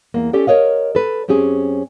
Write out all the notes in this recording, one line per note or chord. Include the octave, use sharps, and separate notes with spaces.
E2 A#3
C#4 G4 A4 D5 G5
A#4 C5 C#5 D#5 F5
A4 B4
F#2 C4 C#4 G4 G#4